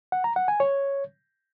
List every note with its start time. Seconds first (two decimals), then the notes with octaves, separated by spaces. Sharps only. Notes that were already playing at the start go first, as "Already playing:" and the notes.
0.12 F#5
0.24 A#5
0.36 F#5
0.48 G#5
0.60 C#5